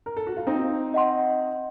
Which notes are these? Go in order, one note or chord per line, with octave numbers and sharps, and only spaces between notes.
A#4
A4
F#4
F4
C4 D#4 C5
D#5 F#5 C6